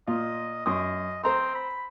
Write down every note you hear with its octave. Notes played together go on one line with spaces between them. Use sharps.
A#2 F4 D#5
F#2 D#5 C6 D#6
C4 C5 A#5 C6
B5